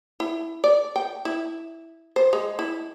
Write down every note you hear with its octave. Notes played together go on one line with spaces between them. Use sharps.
E4
D5
G5
E4
C5
G#3
E4